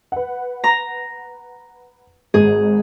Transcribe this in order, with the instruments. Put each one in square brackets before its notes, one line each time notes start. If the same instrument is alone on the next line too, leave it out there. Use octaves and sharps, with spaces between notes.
[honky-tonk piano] B4 F#5
[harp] A#5
[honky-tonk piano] G#1 G#2 [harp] G#4